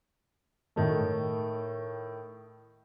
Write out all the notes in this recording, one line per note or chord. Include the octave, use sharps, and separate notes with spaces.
A2 D#3 A3